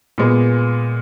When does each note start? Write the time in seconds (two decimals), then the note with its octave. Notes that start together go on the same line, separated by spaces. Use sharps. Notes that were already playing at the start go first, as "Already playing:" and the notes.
0.18 A#2 G#3 B3